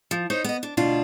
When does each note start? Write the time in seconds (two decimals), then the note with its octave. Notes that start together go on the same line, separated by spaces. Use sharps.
0.11 F3
0.30 D#4 C5 C#5
0.44 B3 D#5
0.63 D4
0.77 D2 B2 D4 F4